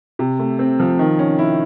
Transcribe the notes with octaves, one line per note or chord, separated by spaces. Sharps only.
C3
A3
C4
F3
D#3
C#4
E4